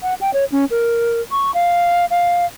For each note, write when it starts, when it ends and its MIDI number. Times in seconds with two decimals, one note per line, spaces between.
0.03 0.15 78
0.21 0.33 79
0.34 0.45 73
0.52 0.65 61
0.71 1.21 70
1.32 1.54 85
1.54 2.05 77
2.11 2.46 77